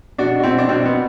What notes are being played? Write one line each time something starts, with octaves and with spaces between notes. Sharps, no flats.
B2 D4 F#4
F#4
B2 C4 E4
D4
B2 C4
B3